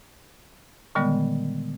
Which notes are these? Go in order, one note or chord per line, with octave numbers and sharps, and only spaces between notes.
A#2 D3 D#3 G3 G#3 B3